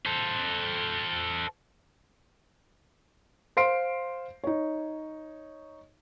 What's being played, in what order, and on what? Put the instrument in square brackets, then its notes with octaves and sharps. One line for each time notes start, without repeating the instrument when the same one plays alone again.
[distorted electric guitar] A4 C5
[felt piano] C5 F5 C6 C7 D7
D#4 C#5